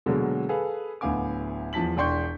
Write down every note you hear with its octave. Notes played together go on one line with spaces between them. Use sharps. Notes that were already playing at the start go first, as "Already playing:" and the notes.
B2 D3 F#3 G#3 A#3
G#4 A4 B4 F5
D1 D2 B3 F5 G#5 D6
E2 F3 A5 B6 F#7
E1 D4 G5 C6 C#6 G6